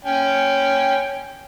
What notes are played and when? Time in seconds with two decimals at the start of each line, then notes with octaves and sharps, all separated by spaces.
0.05 C#4 G5